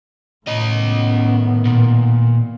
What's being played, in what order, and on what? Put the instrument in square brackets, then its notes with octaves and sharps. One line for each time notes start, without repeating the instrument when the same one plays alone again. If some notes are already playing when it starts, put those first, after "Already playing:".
[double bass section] A2 D#3 B3 [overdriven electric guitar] C#4 D#5
[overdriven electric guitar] A#2